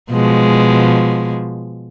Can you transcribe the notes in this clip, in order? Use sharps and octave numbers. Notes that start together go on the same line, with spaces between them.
B2 F3 G#3